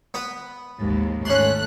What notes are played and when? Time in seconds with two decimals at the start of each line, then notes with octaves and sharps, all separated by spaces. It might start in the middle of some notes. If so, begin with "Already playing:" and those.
0.14 B3 B4
0.79 A1 D#2 G#2
1.25 G#1 A3 C#4 C6 F#6